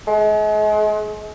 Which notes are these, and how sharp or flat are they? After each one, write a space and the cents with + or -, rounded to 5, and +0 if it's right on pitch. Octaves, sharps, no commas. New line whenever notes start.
G#3 +40